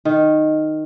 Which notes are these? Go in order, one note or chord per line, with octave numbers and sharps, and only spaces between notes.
D#3